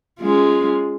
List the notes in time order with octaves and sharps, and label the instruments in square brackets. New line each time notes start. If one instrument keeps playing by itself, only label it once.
[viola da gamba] G#3 C#4 F4